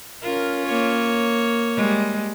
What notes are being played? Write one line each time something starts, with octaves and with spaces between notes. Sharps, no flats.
C#4 F4 A#4
A#3 C#5
G3 G#3